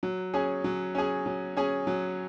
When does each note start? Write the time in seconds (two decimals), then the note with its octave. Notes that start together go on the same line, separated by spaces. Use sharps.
0.03 F#3
0.34 C#4 G#4
0.64 F#3
0.95 C#4 G#4
1.26 F#3
1.57 C#4 G#4
1.87 F#3